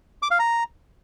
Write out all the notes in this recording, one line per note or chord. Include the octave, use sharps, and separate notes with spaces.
D6
F5
A#5